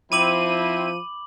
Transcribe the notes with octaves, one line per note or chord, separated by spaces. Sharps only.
F3 C4 E4 B5 D6 D#7 F#7